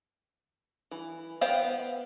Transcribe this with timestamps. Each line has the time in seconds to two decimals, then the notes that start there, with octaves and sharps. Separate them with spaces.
0.91 E3
1.41 B3 C5 F5 G5